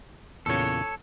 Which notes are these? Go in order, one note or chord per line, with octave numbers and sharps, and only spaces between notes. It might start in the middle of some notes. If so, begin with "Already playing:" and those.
E2 A#2 C#3 A4 C#5